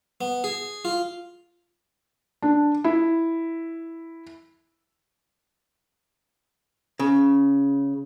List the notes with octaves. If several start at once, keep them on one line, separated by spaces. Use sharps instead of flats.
B3
G#4
F4
D4
E4
C#3